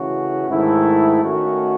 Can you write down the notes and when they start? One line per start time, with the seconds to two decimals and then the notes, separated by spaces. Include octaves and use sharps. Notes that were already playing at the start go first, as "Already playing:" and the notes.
Already playing: C#3 E3 A3 C#4 F#4
0.48 G#2 D#3 A3 E4
1.23 D#3 A3 C#4 F#4